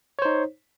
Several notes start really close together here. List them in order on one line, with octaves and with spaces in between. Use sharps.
C#5 C5 D#4